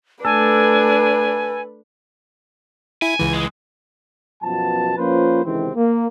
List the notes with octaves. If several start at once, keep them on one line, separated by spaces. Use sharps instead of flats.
A3 D4 A4 B4 G#5
E4 G#5
C#2 E3
G#3
F#2 B2 F3 B3 A5
F3 A#3 C#4 F4 B4 C5
C#2 C3 D#3 E3 C4
A#3